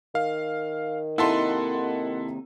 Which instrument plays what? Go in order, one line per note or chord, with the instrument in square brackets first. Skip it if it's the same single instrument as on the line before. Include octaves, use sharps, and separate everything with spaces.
[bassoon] D#3 [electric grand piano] F5
[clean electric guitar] D#2 C3 D#4 [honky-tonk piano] E4 A4 C6 [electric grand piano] F#5